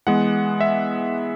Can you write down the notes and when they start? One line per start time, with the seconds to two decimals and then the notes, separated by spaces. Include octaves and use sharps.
0.07 E3 G#3 B3 F#5
0.61 E5